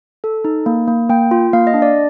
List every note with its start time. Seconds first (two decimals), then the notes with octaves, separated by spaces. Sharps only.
0.24 A4
0.45 D#4
0.66 A#3
0.88 A#3
1.09 A#3 G5
1.31 F4
1.53 A#3 F5
1.67 D#5
1.74 D4
1.82 D5